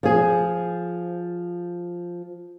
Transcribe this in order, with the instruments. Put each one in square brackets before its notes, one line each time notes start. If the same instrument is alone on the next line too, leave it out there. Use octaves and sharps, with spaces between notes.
[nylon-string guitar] F3 G#4